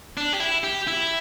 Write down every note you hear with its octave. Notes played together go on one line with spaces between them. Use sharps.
D4
G4
E4
G4
E4